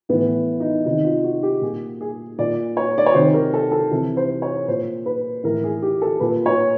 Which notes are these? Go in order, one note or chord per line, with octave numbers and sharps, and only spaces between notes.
A2 E3 B3
D#4
C3 D#3 D#4
F4
F#4
G4
A#2 G#4
G#4
A#2 D5
C#5
D5
C#5
C3 D#3 C5
A#4
A4
A4
C3 E3
C5
C#5
A#2 C5
B4
A2 E3 A#4
G#4
G4
A4
A#2 B4
C#5